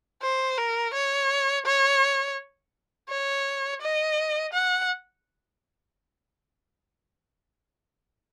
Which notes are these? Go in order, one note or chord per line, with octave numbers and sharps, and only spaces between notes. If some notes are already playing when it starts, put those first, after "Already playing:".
C5
A#4
C#5
C#5
C#5
D#5
F#5